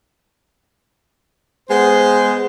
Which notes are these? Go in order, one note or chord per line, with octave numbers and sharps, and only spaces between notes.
G#3 B3 C5